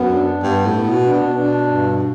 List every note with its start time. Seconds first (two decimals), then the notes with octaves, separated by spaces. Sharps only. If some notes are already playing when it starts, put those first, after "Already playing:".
Already playing: F#2 B3
0.11 D4
0.43 G2 B3
0.66 A2
0.74 B3
0.89 B2
1.05 D4
1.13 B2
1.36 D4
1.67 G2